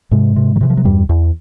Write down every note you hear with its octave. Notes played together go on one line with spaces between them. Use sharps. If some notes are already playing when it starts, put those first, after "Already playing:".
G#2 C3 G#3
C3
D#3
C3 E3
F3
F#3
E2 G2 G3
E2